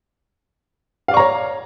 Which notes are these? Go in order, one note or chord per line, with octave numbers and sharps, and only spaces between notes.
C#5 D5 F5 A#5 C#6